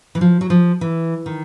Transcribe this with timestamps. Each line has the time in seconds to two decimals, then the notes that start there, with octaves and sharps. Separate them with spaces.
0.15 E3
0.21 F3
0.41 F#3
0.50 F3
0.81 E3
1.26 D#3